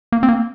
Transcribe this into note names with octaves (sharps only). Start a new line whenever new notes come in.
A#3
C4
A#3